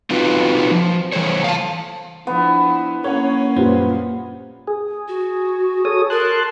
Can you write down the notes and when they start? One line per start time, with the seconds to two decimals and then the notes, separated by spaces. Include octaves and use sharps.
0.10 C4 D#4 F4 F#4 B4
0.71 F3
1.13 E3 F#3 A4 C5 C#5
1.44 F5 A5
2.27 F3 B3 D4 E4
3.04 A#3 C#4 A#4 C#5 F#5
3.56 F#2 A#2 G3 B4 C5
4.67 G#4
5.08 F#4
5.85 A4 C#5 D#6
6.10 A#4 A5 C6 F#6